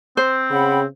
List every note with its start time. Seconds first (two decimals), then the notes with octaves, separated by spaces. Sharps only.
0.17 C4 C5
0.51 C#3 F#5 G5 B5